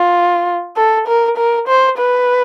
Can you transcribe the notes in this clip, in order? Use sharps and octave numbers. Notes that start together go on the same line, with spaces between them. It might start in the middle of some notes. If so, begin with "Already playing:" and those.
Already playing: F4
A4
A#4
A#4
C5
B4